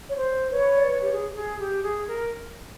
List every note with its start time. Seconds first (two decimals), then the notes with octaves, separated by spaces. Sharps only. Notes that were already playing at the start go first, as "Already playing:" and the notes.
0.10 C#5
0.16 C5
0.51 B4 C#5
0.75 D5
0.87 B4 C#5
1.01 G4
1.12 G#4
1.30 G4
1.36 G#4
1.59 G4
1.83 G#4
2.08 A#4